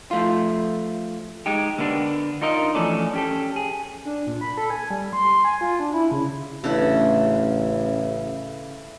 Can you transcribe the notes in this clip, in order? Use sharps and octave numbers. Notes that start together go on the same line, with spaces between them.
F3 A3 F4
G#3 D#4 G4
D3 A#3 B3 C#4 D4
D4 D#4 F4 A#4 D#5
E3 F3 A3 C#4 A4 D5
C#4 G4 A4
G#4
D4
A#2
B5
A4
G#5
G3
C6
G#5
F4
D4
E4
C#3
A1 A2 C#3 D4 B4 E5 F#5